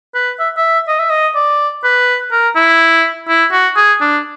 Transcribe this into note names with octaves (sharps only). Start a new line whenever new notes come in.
B4
E5
E5
D#5
E5
D#5
D5
B4
A#4
E4
E4
F#4
G#4
D4